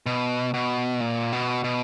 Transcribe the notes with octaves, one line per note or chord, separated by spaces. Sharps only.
B2
B2
A#2
B2
B2